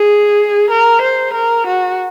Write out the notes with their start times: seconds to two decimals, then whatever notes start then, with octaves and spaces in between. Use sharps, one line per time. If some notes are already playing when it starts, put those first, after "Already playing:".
Already playing: G#4
0.71 A#4
1.02 C5
1.34 A#4
1.67 F#4